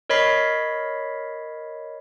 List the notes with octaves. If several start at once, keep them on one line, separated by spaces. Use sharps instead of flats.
A#4 C#5 D#5 B5 B6 C7